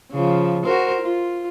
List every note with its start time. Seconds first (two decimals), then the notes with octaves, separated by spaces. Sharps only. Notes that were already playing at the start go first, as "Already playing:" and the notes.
0.12 C#3 F3
0.64 F#4 A#4 C5
1.01 F4